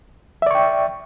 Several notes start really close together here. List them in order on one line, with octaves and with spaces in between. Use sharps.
E5 D5 C#6 G5